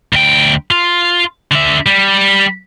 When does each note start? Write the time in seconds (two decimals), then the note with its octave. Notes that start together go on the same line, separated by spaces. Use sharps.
0.13 D2 G5
0.71 F4
1.51 D3 E5
1.86 G3